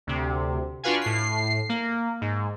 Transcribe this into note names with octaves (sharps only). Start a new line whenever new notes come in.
D2 C3
D4 F4 F#4 B4 F5 G#5
A2 C7
A#3
G#2